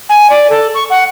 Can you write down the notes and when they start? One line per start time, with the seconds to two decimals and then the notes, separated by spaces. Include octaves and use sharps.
0.09 G#5
0.30 D5
0.50 A4
0.75 C#6
0.90 F#5